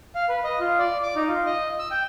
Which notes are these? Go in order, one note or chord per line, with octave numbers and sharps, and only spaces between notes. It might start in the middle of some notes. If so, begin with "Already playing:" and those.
F5
B4
D#5
F4
D5
D6
D#4
F4
D#5
E6
G5